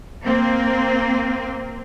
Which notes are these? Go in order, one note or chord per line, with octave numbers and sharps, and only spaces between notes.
A#3 C4